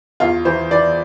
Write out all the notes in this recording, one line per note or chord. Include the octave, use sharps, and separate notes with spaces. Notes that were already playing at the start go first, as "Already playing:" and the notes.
E2 F4
E3 C5
E3 D5